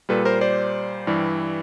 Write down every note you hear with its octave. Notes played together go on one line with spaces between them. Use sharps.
A#2 G3 A4 B4
A#4 C5
C5 D5
G2 E3 G3